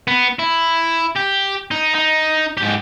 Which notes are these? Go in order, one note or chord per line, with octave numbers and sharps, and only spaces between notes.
B3
E4
G4
D#4
D#4
G#2 G4